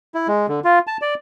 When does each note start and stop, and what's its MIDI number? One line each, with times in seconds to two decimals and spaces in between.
0.15 0.27 64
0.28 0.46 56
0.48 0.60 50
0.64 0.79 65
0.87 0.97 81
1.02 1.14 74